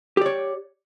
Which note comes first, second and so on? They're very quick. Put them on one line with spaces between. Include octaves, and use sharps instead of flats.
G4 D5 C#5